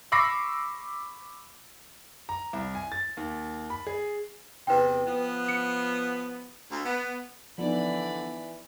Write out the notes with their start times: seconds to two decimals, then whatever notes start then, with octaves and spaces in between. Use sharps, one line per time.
0.12 B5 C#6 D6 E6 A#6 C7
2.29 A#5
2.53 C2
2.75 G#5
2.92 A6
3.17 D#2
3.70 B5
3.87 G#4
4.67 E2 C3 B4 G5
5.06 F3 B3
5.48 C#7
6.69 D2
6.85 B3
7.58 D3 E3 F3 B3 D#4 D5 B5